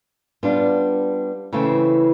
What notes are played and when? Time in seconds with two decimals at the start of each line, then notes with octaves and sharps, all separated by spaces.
0.43 G3 B3 D4 F4
1.53 C#3 E3 A3 C4